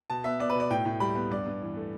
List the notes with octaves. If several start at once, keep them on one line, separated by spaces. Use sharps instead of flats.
B2 A5
B3 E5
B3 D5
B4
B2 D5
A2 G5
A2
G3 B5
B3
G2 D5
G2
E3
A3